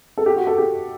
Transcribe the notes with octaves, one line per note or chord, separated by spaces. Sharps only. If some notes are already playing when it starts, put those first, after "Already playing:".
A4
G4
F#4
A4
G4